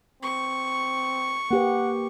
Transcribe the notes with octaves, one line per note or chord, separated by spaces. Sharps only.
C4 C#6
A#3 G4 B4 F#5